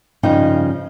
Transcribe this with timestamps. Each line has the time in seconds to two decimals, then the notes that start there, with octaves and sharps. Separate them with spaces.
0.23 G2 C#3 F3 D#4 G5